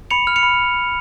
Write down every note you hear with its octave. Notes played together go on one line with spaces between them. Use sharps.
B5 C#7 F7
F6
C#7 F7
B5